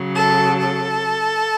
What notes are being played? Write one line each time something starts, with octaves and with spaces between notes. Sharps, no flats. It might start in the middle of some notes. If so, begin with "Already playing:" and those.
Already playing: C#3 F#3
A4
A4